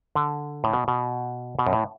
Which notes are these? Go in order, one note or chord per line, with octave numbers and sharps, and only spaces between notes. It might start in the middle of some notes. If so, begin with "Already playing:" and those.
D3
A2
B2
B2
B2
F#2
A2